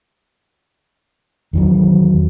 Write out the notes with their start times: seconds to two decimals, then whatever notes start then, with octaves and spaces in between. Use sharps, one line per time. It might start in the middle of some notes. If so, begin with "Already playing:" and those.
1.53 E2 D#3 F#3